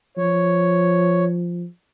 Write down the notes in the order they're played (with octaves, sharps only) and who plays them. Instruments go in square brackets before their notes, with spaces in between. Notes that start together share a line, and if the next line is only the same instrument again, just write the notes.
[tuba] F3 [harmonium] C#5